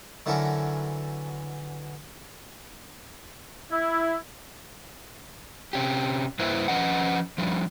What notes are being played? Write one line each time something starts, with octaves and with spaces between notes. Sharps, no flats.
D3 E3 F#3 C#4 A4 A#4
E4
C3 C#4 G4
G2 A#3 E4 B4 C5 E5
F3 C#4 B4 D#5 F#5
F3 G3 D4